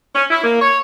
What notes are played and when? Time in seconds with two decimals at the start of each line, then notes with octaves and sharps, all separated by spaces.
0.15 C#4
0.31 E4
0.44 A#3
0.62 C#5